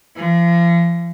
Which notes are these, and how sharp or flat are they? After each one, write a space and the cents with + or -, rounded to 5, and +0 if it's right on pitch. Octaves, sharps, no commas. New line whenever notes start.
F3 -40